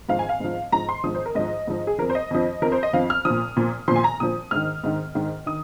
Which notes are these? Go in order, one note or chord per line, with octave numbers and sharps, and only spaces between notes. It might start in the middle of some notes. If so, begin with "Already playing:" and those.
G#2 F3 F5
G#5
F5
G#2 F3
G#2 F3 A#5
C6
G#2 F3 D#6
C5
A#4
G#2 F3 D#5
G#2 F3
G#4
F2 F3 A#4
C5
D#5
F2 F3
F2 F3 A#4
C5
D#5
F2 F3 F5
F6
A#2 F3 D#6
A#2 F3
A#2 F3 C6
G#5
A#5
A#2 F3 D#6
G#2 D#3 F6
G#2 D#3
G#2 D#3
D#3 D#6